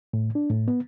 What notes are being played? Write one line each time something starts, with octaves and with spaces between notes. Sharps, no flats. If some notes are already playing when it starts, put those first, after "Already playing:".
A2
D4
A2
B3